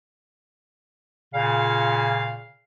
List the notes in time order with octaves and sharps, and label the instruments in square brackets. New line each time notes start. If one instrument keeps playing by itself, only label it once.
[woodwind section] A#2 C#3 F5